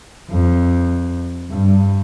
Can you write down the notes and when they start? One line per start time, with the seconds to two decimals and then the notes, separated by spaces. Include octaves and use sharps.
0.30 F2
1.51 G2